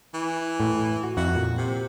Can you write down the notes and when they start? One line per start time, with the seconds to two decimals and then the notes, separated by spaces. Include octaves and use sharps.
0.14 E3
0.60 A2
1.03 F#4
1.17 F2 E4 F#4
1.35 A#2
1.57 C3